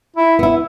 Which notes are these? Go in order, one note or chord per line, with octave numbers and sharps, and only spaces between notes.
E4
B3 E4